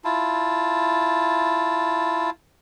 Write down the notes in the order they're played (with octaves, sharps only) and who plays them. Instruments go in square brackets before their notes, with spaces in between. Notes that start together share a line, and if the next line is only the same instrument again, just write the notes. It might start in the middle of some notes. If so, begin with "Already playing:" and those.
[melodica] E4 F4 A5